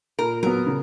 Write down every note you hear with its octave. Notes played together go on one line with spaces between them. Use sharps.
A#2 A#4
F#3 B3 A#4
C#3